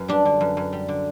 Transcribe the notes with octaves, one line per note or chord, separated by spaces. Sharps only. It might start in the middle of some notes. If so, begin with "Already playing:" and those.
Already playing: F#2
G3 D4
D3
F#2
F#2
G3
D3